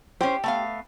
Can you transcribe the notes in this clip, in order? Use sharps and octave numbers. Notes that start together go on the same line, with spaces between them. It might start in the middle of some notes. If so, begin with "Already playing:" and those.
C#4 G4 C5
A3 B3 F5